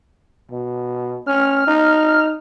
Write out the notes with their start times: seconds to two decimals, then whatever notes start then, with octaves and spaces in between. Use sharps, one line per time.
0.52 B2
1.27 C#4 F6
1.67 D#4